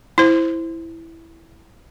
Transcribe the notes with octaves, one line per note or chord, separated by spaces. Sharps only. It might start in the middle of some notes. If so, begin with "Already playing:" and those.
E4 C5